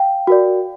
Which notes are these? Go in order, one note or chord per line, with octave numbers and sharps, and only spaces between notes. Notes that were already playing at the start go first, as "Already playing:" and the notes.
Already playing: F5 G5
F#4 A#4 D5